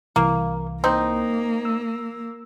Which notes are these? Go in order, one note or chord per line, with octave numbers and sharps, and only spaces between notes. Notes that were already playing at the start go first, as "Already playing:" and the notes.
C2 E3 A#3
A#3 C4 D#4
E6